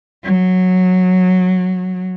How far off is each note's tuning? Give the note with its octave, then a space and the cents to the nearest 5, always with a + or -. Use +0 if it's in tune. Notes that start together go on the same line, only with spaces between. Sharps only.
F#3 -10